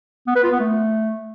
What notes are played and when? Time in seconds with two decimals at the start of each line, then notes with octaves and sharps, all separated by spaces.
0.27 B3
0.35 B4
0.44 F4
0.52 B3
0.60 A3